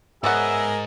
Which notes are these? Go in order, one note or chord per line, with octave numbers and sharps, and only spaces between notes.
G#2 B3 G#4 A#4 C#5 E5 F#5